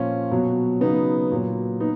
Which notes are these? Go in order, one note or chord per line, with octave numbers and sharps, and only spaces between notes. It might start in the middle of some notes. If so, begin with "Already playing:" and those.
Already playing: A#2 F3 C#4 F4
B2 F#3
C#3 F#3 B3 D#4
A#2 F#3
B3 D#4